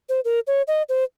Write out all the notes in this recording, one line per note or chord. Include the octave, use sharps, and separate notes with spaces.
C5
A#4
C#5
D#5
C5